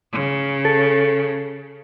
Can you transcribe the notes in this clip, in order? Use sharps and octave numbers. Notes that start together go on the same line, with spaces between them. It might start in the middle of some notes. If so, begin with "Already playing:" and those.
C#3
A4